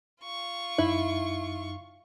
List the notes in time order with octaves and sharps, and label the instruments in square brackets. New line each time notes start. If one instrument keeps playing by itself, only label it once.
[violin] F4 C#6
[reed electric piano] F#2 D#4 [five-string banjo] E4